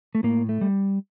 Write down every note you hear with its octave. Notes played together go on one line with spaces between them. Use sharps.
A3
A2 A#3
A3
G3